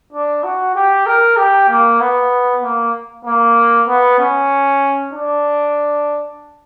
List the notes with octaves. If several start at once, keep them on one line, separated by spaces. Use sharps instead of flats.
D4
F#4
G4
A#4
G4
A#3
B3
A#3
A#3
B3
C#4
D4